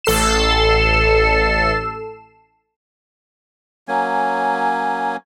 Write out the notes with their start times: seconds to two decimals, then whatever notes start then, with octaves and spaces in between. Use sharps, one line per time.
0.04 A1 A4 C7 E7
3.88 F#3 A#3 C#4 G#5